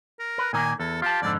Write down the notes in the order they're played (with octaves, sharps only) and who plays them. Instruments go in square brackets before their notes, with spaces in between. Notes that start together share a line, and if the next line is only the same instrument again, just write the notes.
[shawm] A#4
[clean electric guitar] B4
[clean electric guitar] A#2 D#3 A#3 [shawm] G#5
[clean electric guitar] E2 [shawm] A4
[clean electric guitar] F4 A5 [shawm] G4
[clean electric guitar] F2 G#2 D3 [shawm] D5